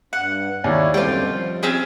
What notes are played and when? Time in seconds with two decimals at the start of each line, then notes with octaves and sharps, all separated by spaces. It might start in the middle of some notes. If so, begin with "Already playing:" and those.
0.13 G2 F#5
0.64 D#2 E4 C#5 D5
0.94 F#2 B2 D3 G3 C4 F4 G5
1.27 F3
1.63 C4 C#4 G#4